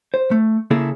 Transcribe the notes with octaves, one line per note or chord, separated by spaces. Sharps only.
C5
A3
C#3 A#3 C#4 E4 G#4 A4